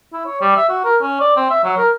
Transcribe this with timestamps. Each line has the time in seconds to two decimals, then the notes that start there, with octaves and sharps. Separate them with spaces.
0.13 E4
0.26 C#5
0.41 G3
0.56 E5
0.69 F#4
0.84 A#4
1.01 C#4
1.20 D5
1.36 C4
1.50 E5
1.64 F#3
1.77 A#4